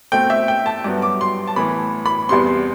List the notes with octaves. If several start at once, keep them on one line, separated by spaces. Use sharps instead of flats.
B2 A3 C4 G5
E5
G5
A5
G2 F#3 B3
D6
C6
A5
A2 E3 B3 B5
B5
E2 C3 G3 B3 C6
C6